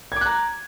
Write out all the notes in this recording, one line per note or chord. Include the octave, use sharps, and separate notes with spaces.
A#5 D6 F#6 G#6